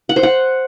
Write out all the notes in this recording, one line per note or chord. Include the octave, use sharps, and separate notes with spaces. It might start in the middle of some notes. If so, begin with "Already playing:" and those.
F#5
C5
F#5